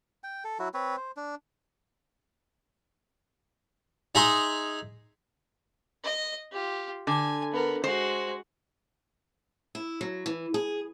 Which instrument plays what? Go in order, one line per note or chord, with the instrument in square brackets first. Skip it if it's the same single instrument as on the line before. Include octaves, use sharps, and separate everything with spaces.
[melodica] G5
A4
F#3 E4 F#4
C4 B4 C#5
C5
D4
[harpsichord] D#4 G#4 E5 A#5 C6
[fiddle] D#5
F4 G4
[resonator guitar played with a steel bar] D3 [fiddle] G#5
[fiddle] B3 A#4
[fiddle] G#3 F#4 [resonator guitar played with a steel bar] C5
[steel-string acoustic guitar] E4
F#3
E3
G#4